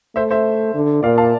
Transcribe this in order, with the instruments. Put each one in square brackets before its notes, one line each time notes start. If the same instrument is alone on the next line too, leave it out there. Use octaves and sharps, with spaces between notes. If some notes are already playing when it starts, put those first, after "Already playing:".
[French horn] A3 [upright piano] C5 E5
[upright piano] C5 E5
[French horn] D3
[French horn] A#2 [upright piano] D5 F5
[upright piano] F5 A5